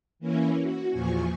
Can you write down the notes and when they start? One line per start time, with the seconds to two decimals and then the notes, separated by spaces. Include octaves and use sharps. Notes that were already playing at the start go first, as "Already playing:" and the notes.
0.19 E3 A#3 C#4 E4
0.61 F#4
0.91 E2 A#2 F3 G#5 C#6